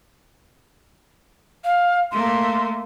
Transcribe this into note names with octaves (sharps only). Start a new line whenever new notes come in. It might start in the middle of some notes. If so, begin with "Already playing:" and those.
F5
A3 A#3 C6